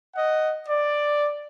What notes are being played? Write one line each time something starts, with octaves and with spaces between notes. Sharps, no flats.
D#5 F#5
D5